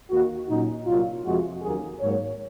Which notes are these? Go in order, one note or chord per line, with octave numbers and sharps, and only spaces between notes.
D#2 D#3 A#3 F#4
A#2 F#3 C#4 D#4
C2 A#2 F#3 F4
F2 C3 F3 G#3 F#4
D#2 C#3 F#3 A#3 G#4
G#2 F#3 A#3 C#5